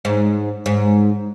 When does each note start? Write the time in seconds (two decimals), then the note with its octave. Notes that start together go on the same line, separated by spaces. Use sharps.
0.05 G#2
0.66 G#2